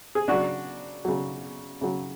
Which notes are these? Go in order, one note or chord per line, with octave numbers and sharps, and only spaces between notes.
G#4
C#3 F#3 D4 F#4
C#3 F#3
C#3 F#3